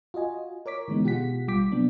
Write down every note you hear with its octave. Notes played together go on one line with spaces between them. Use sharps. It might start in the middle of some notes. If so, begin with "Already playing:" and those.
F4 F#4 D#5 G#5
A#4 C#5 D6 B6
D3 E3 G#3 B3 D#4
B2 F4 G4 G#4 F#5 B6
A1 G3 F4 G5 D6 B6
C3 F#3 A#3 B3 D4